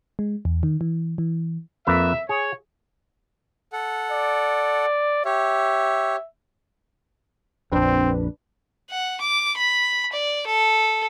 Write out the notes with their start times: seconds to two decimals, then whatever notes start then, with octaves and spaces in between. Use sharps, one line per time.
0.19 G#3
0.45 E2
0.63 D#3
0.81 E3
1.18 E3
1.87 F2 A#3 B4 E5
2.29 G#4 C#5
3.73 A4 F#5
4.12 D5
5.25 G4 C#5 E5
7.72 A#1 F2 C4 D4 B4
8.90 F#5
9.21 D6
9.57 B5
10.12 D5
10.46 A4